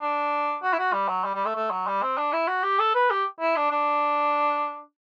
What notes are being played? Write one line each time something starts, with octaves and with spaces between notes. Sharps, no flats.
D4
F#4
E4
F#4
G3
F#3
G3
G3
A3
A3
F#3
G3
C4
D4
E4
F#4
G4
A4
B4
G4
E4
D4
D4